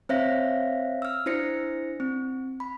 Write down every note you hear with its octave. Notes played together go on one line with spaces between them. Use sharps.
C4 C5 C#5 E5 F5 A#6
E6 F6
D4 E4 C5 A#6 C#7
C4
B5